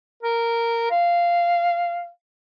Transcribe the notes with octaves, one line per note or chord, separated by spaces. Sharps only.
A#4
F5